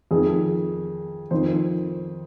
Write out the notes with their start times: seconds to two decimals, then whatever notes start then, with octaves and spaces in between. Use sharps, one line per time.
0.11 F2 D#3 G#4
1.31 F2 D#3 C5